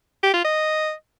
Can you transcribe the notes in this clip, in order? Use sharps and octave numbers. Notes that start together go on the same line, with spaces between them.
G4
F4
D#5